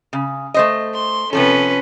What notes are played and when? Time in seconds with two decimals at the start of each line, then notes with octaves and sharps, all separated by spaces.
0.13 C#3
0.54 A3 C5 D#5
0.94 C6
1.33 C3 F3 C#4 A4 B4